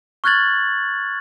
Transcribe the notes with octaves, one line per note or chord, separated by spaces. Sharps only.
C#6 F6 F#6 G#6 A6 F#7